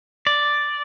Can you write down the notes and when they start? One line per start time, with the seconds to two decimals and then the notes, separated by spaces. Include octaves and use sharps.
0.27 D5